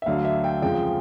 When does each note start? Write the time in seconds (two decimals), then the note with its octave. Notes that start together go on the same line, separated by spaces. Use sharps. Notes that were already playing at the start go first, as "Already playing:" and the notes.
0.02 E5
0.06 D2 D3 F#3 F5
0.25 E5
0.44 G5
0.62 F2 C#3 F3 G#3 G5